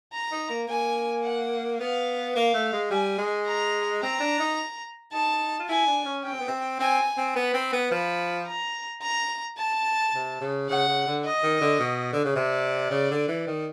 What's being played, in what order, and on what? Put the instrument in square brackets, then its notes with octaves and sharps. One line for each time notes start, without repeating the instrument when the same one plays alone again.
[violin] A#5
[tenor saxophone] D#4
A#3
[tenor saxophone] A#3 [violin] G#5
[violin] F#5
[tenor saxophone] B3 [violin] F5
[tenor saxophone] A#3 [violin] F5
[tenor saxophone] A3
G#3
[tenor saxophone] G3 [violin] G#5
[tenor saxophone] G#3
[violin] A#5
[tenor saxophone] C4 [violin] A#5
[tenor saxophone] D4
D#4
[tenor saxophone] D#4 [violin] A5
[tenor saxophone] F4
[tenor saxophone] E4 [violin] G#5
[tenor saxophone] D4
C#4
[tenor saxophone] C#4 [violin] G5
[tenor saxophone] C4
B3
C4
[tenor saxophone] C4 [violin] G#5
[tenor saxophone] C4
[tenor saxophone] B3 [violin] B5
[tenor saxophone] C4
B3
[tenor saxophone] F3 [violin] B5
[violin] A#5
A#5
A5
[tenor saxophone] C3
C#3
[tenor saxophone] C#3 [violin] F#5
[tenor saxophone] C#3
D3
[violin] D#5
[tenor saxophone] D#3
D3
B2
D3
C#3
[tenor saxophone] C3 [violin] D5
[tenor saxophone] C#3
D3
E3
D#3